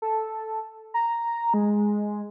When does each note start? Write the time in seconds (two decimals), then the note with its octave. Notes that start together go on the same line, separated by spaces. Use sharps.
0.02 A4
0.94 A#5
1.54 G#3